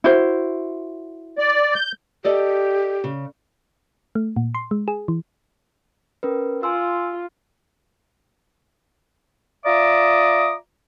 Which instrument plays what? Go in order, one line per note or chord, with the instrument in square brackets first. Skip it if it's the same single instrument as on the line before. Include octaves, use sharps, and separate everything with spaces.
[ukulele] E4 F#4 C5
[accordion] D5
G6
[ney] G4 [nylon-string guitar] A4 D5 D#5
[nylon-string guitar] C#3
[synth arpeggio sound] A3
A#2
C6
G#3
G#4
E3
[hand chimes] C#4 A#4 B4
[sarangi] F4 [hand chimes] G#5 C6 E6
[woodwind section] F4 D5 E5 A#5 D6 D#6